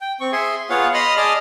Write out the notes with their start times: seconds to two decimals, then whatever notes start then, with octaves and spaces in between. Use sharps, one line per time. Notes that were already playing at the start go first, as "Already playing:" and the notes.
0.01 G5
0.20 C4 C#6
0.32 G#4 E5 G#5 C6
0.70 B3 F4 G#4 C#5 F5 F#5
0.94 D#5 B5 C6 D#6 F6
1.17 G#4 D5 D#5 A5 D#6 F6